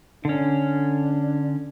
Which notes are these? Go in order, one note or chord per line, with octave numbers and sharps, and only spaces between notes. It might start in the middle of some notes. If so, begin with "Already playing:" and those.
D3 C#4 D4